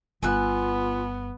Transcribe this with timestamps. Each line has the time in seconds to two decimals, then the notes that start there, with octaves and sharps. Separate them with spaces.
0.23 G1 B3 F4 G#5 E6 F#6